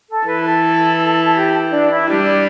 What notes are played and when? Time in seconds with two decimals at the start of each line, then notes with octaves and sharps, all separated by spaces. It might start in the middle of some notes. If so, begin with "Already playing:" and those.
0.09 A4
0.27 E3 B4
0.45 A4
1.25 A4
1.36 G4
1.72 D4
1.90 E4
2.08 G3 D4